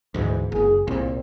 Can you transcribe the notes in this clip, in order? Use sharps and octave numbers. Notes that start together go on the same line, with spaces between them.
D2 G#2 E3
F#1 G#4
C2 A#2 C4